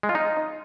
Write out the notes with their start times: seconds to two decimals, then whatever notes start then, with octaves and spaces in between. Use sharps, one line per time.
0.03 G#3
0.09 F4
0.15 D#4